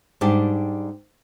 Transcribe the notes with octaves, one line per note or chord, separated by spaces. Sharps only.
G#2 G3 D4 G4